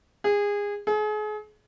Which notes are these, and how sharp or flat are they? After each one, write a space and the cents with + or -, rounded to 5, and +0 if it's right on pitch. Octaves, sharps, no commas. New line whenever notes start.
G#4 -25
G#4 +35